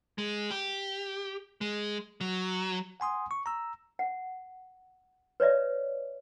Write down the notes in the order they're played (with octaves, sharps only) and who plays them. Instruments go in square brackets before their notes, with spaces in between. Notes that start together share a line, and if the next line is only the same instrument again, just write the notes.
[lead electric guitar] G#3
G4
G#3
F#3
[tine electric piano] F#5 G#5 C6 D#6
C#6
A#5 E6
[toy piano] F#5
B4 C#5 D5 E5